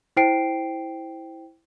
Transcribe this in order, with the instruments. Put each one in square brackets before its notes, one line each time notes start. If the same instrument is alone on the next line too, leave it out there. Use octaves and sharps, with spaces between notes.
[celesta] E4 C5 G5 C7 D7